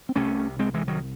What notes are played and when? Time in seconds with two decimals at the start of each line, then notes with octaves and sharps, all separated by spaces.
0.09 C4
0.16 C2 C3 A3 C#4
0.59 G#3 C4
0.74 E3 G#3
0.88 D#3 F#3